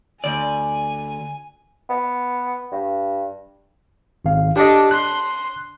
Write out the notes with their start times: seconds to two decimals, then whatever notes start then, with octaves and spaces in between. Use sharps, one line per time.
0.24 D2 D5 G#5
1.90 B3
2.72 G2
4.25 G#1 F5
4.56 D4 G4 A4 D#5
4.91 C6 F#6